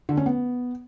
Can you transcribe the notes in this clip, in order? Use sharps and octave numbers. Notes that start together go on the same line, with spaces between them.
D3
C#4
B3